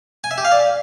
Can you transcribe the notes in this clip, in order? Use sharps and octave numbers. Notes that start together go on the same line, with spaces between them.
G#5
E5
G4
F5
D5